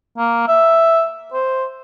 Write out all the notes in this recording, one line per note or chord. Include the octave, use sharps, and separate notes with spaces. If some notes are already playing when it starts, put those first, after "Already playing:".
A#3
E5
C5